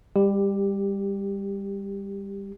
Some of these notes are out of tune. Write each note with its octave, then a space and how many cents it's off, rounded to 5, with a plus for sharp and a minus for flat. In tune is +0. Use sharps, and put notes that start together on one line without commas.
G3 +25 G4 +5